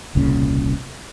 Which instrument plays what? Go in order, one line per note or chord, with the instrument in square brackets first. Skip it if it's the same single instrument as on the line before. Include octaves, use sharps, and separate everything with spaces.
[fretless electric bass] D#1 C2 A#2 C#3